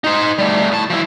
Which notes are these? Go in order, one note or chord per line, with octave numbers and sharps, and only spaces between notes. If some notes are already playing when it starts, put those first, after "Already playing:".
D#4 C5
G3 A3
A2 A5
F3 E4